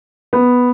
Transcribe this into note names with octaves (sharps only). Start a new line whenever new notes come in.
B3